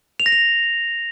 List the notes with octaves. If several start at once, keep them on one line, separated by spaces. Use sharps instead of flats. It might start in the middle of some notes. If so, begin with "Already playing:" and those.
F7
A#6
F7